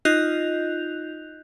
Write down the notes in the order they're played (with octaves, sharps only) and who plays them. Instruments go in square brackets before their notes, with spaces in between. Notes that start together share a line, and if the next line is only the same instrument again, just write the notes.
[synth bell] D#4 F4 D#5 F#6 G6 F7